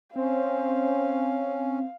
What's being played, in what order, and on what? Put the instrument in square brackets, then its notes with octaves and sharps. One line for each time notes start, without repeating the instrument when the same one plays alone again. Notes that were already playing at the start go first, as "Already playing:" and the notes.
[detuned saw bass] C4 [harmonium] C#4 [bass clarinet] C5 [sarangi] F5